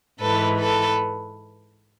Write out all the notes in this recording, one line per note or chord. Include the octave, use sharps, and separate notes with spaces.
G#2 E3 A4 B4
A4 B4